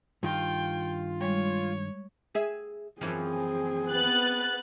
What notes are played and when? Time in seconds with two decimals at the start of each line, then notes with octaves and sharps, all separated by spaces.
0.23 G2 D#3 F4 G5
1.21 G3 G#3 C#5
2.35 G#4 E5
3.01 F#2 E3 F3 C4 G#4
3.90 B3 F#6 A6